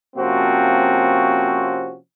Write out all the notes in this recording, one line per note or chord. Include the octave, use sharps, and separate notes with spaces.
C3 F3 A#3 C4 C#4 F#4